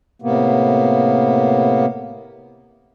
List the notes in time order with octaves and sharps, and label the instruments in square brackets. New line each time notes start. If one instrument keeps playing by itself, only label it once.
[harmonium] A2 C3 A#3 B3